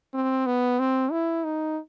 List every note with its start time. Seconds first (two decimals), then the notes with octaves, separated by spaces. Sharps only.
0.14 C4
0.46 B3
0.79 C4
1.11 E4
1.44 D#4